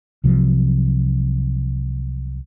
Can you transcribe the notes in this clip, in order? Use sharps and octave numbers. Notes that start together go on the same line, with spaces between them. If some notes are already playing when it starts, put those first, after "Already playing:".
C2 C3 F3 F#3